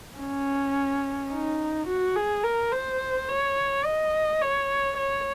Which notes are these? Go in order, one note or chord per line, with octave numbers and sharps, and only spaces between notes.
C#4
D#4
F#4
G#4
A#4
C5
C#5
D#5
C#5
C#5